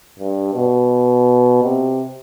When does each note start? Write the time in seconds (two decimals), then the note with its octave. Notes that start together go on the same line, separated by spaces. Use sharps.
0.19 G2
0.55 B2
1.63 C3